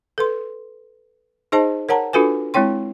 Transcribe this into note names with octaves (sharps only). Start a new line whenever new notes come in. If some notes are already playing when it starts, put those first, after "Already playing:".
A4 B4 C6
D#4 G#4 C5 D#5 A5
A#4 C#5 F#5 A5 A#5
D4 F4 F#4 A4 B4 G#5
G#3 C4 E4 C#5 G5 C6